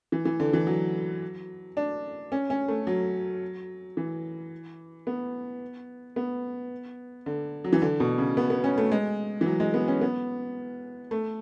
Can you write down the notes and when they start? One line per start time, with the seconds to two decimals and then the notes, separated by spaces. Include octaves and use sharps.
0.12 E3
0.25 E3
0.40 D3
0.53 E3
0.67 F#3
1.77 D4
2.32 C#4
2.50 C#4
2.68 A3
2.87 F#3
3.97 E3
5.07 B3
6.16 B3
7.26 D3
7.64 F#3
7.73 E3
7.82 D3
8.00 B2
8.18 C#3
8.37 B3
8.50 B3
8.64 C#4
8.78 A3
8.92 G#3
9.41 E3
9.46 F#3
9.60 G#3
9.74 B3
9.88 C#4
10.01 B3
11.11 A3